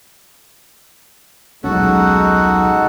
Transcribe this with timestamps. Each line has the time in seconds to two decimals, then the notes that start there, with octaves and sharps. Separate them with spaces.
1.64 D#1 B1 G#3 C#4 D#4 F#4 A4 F#5